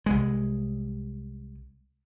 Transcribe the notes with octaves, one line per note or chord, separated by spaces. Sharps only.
C2 G#3